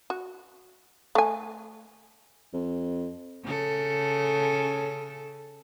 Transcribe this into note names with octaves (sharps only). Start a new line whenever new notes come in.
F#4
A3 G#5
F2
C#3 A4